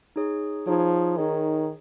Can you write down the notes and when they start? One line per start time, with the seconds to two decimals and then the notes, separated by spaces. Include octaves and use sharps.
0.16 D#4 G#4 C#5
0.67 F3 D#4 G#4 C#5
1.17 D#3 D#4 G#4 C#5